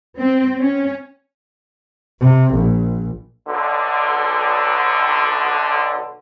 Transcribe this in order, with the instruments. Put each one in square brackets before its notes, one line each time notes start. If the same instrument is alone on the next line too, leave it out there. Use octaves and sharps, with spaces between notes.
[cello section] C4
C#4
[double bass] C3
A#1
[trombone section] B1 D3